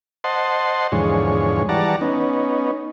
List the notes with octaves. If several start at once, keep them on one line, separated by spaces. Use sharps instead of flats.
C5 D#5 F#5 A5 C6
E2 G#2 D3 F3 G#3 C#5
E3 G3 D5 F#5 A5 A#5
B3 C#4 D#4